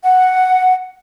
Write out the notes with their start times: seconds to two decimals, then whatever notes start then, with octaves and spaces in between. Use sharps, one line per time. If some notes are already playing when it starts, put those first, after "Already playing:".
0.03 F#5